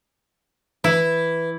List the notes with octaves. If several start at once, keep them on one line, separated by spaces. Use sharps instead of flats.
E3 E4